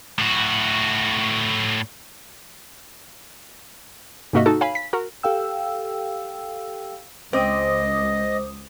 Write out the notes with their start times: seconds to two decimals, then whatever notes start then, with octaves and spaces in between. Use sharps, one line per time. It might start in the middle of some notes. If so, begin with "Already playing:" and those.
0.18 A2 F#4
4.33 G#2 C3 A#3 F#4 D#5 E5
4.46 D#4 F#4 A4
4.61 C#5 F5 G#5 B5
4.75 B6
4.93 F#4 A#4
5.23 G4 A4 F5 G5 E6
7.33 C#2 C4 C5 D#5 D6 D#6